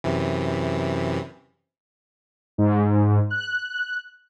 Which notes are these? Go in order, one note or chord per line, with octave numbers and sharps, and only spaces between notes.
F#2 C3 E3
G#2
F#6